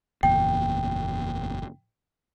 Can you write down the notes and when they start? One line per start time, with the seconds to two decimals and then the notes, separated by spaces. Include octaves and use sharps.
0.23 F#1 E2 A#2 G5